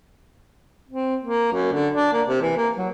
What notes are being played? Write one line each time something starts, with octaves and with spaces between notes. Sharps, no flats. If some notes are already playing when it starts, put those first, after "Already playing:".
C4
A#3
F#2
D3
D4
A#3
C3
E3
A#3
F#3